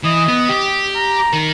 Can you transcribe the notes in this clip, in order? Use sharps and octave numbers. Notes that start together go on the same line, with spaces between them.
E3 D#5
B3
G4
A#5
D#3